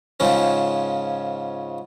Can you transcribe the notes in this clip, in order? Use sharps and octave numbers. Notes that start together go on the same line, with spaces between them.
G#2 C#3 F3 C#4